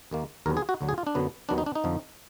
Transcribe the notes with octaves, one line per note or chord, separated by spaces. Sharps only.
D#2 D#3 A#3
D#2 D3 F#3 B3 A#4
G#4
F#4
D2 D3 F#3
G#4
F4
D4
F#2 D3 F#3 B3
D#2 D#3 F#3 B3 D4
D#4
D4
D#4
F2 D3 F3